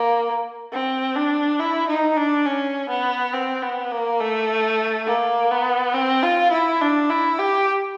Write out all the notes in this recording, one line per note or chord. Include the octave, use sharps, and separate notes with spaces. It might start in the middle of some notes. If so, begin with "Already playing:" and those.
Already playing: A#3
C4
D4
E4
D#4
D4
C#4
B3
C4
B3
A#3
A3
A#3
B3
C4
F4
E4
D4
E4
G4